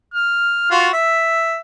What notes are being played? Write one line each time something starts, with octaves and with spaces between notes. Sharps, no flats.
F6
F4 F#4
E5